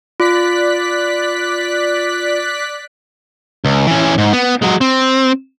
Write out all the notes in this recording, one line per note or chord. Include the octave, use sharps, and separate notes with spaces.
F4 D5 F#6 B6
C#2
E3 C#4
G#2
B3
F#3 G#3
C4